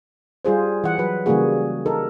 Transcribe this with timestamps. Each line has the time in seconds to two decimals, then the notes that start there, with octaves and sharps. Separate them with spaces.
0.45 G3 F4 G#4 C5
0.84 E3 F#5
0.98 F#3 B4
1.26 C#3 E3 G3 A#3 F#4 G#4
1.86 D#4 A4 A#4